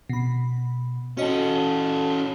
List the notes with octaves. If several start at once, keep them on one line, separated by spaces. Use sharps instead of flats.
B2 B5
C#4 F#4 A4 D#5